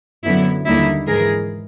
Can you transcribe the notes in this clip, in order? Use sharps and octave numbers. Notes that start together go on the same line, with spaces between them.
F#2 D3 F#3 B3 E4
D#2 D3 G3 A#3 D#4 E4
G#2 E3 G#3 G#4 A#4